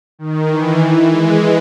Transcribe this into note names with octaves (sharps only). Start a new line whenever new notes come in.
D#3
E3
G#3